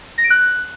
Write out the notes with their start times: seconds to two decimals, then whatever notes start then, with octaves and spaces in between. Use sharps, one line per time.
0.18 A#6
0.24 D7
0.30 F#6